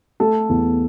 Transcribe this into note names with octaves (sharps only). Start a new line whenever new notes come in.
A3 A4
E2